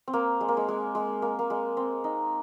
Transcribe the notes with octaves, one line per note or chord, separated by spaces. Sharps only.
C4
A#3
G#3
A#3
G#3
G#3
G#3
A#3
A#3
G#3
C4
D#4